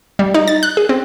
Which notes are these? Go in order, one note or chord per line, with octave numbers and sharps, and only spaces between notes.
G3
D#4
A6
F#6
G#4
C4